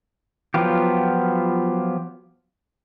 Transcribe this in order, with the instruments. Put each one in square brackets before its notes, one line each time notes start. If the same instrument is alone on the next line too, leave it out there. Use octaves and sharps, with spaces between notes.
[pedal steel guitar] F3 F#3 B3 F4 G4